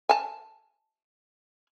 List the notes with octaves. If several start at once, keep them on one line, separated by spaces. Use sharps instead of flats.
G#5 A5